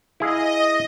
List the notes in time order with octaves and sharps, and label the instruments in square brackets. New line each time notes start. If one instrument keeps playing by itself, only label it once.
[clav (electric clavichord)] E4 G#4 F5 [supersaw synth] D#5